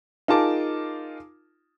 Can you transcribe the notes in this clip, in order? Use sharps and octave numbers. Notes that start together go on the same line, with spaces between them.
D#4 F4 G#4 A#4 A5 D6